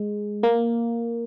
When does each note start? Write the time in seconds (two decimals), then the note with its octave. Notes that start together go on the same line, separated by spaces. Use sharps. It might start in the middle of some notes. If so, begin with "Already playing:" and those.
Already playing: G#3
0.43 A#3